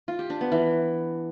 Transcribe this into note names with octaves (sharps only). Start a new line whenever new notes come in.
F4
G4
D4
B3
E3